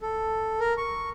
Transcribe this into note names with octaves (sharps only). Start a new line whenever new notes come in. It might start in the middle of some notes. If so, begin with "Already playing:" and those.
A4
A#4
C#6